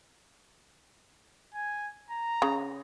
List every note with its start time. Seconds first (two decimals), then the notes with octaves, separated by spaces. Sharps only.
1.54 G#5
2.10 A#5
2.42 C#3